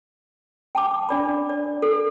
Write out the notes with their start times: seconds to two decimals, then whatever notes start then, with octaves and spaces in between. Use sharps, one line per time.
0.75 G5 A5 D6
1.09 D4 D5 B5
1.49 D5
1.82 A4